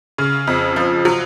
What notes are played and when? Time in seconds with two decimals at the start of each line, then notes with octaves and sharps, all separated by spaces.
0.18 C#3
0.47 F2
0.76 F3
1.05 F#3